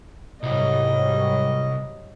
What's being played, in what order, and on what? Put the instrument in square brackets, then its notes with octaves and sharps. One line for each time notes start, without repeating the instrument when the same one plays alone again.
[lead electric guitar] C2 [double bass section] G#2 F#3 G3 [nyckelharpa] D#5